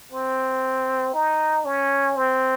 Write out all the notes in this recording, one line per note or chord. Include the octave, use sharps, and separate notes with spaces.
C4
D#4
C#4
C4